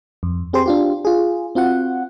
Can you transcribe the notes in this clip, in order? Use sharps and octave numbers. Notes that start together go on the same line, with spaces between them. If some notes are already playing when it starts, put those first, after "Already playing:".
F2
C4 G4 G#4 C5 C6
D4 F4 G4
F4 G#4
C4 F4 F#4 F#5